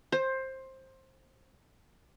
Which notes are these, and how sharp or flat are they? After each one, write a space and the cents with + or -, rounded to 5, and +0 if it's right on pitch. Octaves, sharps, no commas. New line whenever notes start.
C5 +15